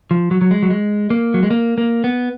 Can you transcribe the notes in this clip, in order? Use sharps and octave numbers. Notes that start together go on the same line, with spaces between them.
F3
F#3
F#3
G#3
F#3
G#3
A#3
F#3
G#3
A#3
A#3
B3